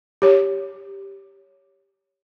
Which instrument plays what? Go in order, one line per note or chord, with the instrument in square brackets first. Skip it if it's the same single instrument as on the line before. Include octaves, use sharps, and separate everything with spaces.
[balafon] G4 C#5